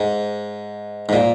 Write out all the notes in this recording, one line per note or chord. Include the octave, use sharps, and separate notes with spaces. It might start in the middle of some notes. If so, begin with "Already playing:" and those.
Already playing: G#2
G#2
A#2